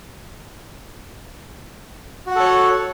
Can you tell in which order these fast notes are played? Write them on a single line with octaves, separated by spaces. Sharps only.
F#4 F#5 A4 C#5